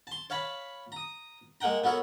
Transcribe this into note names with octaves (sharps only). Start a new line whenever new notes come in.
A5 C6
C#5 F5 A5 B5
A#5 D#6
G#3 A#3 F#5 G5 A#5
B3 F#4 A4 A#4 C#5